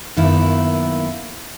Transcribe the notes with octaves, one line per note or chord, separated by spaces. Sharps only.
F#2 D#3 A#3 B3 E4